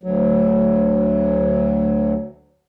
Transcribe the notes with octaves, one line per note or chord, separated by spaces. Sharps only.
D2 F#3